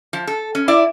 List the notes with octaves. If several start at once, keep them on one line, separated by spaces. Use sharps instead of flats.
F3
A4
C#4
E4 D5